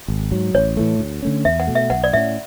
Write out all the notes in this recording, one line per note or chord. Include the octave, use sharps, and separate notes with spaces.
G#1
G#2 F#3
A1 C#5
A2 E3 A3
D2
D3 A3 C#4
E2 E5
F#5
B2 A3
E5
B1 F#5
D5
A2 G#3 C#4 E5